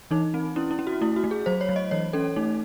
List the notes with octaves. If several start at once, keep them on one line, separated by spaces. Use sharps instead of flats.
E3 D#4
C4
C#4 E4
E4
C#4
F#4
A3 E4
F#4
A3
G#4
F#3 C5
C#5
F#3
D#5
E3 C#5
C#4 A4
A3 D#4